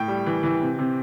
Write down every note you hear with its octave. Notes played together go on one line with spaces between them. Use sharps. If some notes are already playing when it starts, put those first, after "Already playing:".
Already playing: A2 G5
G3
E3
E3
C3
C3